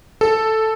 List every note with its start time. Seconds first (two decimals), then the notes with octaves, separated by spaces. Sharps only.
0.21 A4